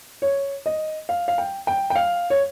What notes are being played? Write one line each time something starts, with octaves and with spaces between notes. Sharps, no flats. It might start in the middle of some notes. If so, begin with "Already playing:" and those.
C#5
D#5
F5
F5
G5
G5
G5
F5
C#5